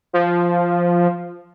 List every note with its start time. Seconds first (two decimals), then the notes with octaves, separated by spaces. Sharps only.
0.13 F3